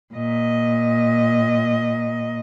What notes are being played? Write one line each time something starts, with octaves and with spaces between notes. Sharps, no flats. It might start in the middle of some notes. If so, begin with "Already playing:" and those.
A#2 D#5